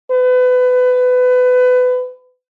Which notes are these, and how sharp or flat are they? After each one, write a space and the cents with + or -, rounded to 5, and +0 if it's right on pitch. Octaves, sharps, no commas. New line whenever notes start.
B4 +25